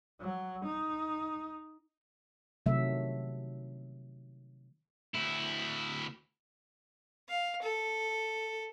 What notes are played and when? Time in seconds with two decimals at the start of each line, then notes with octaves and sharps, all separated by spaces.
0.20 F#3
0.64 D#4
2.66 C3 D#3 F#3 A3 E5
5.15 D2 E4
7.29 F5
7.62 A4